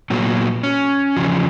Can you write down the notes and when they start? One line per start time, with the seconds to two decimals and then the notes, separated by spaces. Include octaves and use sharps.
0.10 A#2 F#3 B3
0.63 C#4
1.17 E2 C#3 F3